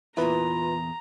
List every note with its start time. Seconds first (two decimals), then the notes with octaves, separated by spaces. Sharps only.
0.17 E2 A#2 E4 F4 B4 A#5